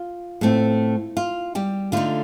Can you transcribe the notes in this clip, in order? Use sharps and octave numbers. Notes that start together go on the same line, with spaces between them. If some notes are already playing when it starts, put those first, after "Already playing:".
Already playing: F4
A2 A3 C4
F4
G3 G4
D3 A3 D#4 F4